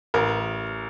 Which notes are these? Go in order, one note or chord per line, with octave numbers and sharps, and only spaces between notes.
A1 A#4